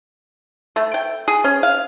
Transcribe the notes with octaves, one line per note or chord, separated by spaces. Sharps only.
A3
G5
G#4
C#4
F5